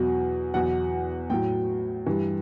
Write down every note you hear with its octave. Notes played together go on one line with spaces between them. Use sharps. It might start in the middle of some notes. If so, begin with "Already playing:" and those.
Already playing: E2 B2 F#3
E2 B2 F#3 F#5
A2 F#3 G5
G2 E3